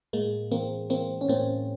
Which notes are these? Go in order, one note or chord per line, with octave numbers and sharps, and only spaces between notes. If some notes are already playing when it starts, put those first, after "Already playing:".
A2 G#3 A#3
E3 A#3 C4
E3 A#3 C4
C#4
A2 A#3 C4